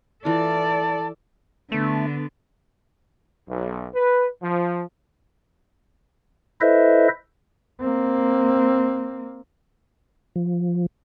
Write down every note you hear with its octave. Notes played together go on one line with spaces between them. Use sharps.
E3 F4 A4 D5 A5
D3 A3 B3
B1
B4
F3
E4 A4 B4 C5 D#5 E5
A#3 C4
F3